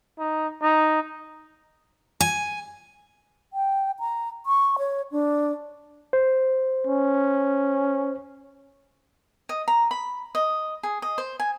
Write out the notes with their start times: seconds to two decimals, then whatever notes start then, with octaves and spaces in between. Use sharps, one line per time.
0.19 D#4
0.62 D#4
2.21 G#5
3.53 G5
4.00 A#5
4.46 C#6
4.79 C#5
5.12 D4
6.13 C5
6.87 C#4
9.49 D#5
9.68 A#5
9.91 B5
10.35 D#5
10.83 G#4
11.02 D#5
11.18 C5
11.40 G#5